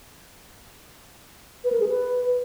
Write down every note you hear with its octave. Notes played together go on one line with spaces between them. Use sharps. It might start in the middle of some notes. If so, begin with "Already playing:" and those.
B4
A#4
G#4
B4